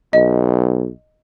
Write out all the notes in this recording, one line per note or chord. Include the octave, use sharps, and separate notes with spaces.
B1 D#5